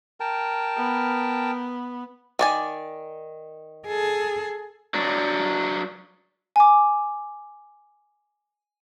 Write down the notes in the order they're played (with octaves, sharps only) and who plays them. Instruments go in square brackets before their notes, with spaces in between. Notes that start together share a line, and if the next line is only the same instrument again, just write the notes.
[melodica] A#4 G5 A5
[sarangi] B3
[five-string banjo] D#3 D5 G#5
[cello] G#4 A4
[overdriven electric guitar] F#3 D4
[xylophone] G#5 D6